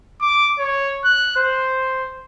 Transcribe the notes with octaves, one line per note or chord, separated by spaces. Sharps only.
D6
C#5
F#6
C5